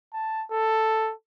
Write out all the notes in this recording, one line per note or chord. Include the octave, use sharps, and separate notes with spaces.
A5
A4